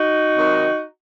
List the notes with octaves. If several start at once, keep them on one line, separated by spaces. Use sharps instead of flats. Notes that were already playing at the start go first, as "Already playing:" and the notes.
Already playing: D#4 F#4
C3 D#3 F#3